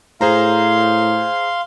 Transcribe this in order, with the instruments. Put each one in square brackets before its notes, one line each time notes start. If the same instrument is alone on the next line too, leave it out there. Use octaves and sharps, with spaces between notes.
[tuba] A2 [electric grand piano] G#4 C5 A#5 [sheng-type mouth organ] F5 C6